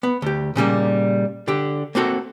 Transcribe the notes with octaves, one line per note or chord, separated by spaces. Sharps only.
B3
D2 G4
A#2 C#3 G3 A#3
D3 G4
A#3 C4 F#4 A4